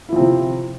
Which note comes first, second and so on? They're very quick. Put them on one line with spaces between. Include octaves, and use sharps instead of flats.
E4 F3 C4 C3